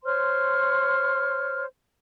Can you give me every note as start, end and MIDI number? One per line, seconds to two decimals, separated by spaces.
0.04 1.65 72
0.04 1.65 73
0.04 1.65 84
0.04 1.65 89